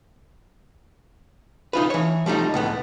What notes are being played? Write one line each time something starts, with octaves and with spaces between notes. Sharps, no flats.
D#4 F4 B4
E3 C#5
F3 G3 A3 D#4
C#2 A2 B3